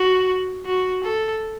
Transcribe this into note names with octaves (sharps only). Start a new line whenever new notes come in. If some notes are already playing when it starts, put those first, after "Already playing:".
Already playing: F#4
F#4
A4